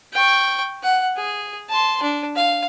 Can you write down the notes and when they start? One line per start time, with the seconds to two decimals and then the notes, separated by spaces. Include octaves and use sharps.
0.13 G5 C#6
0.83 F#5
1.16 G#4
1.69 A5 C6
2.02 D4
2.35 F5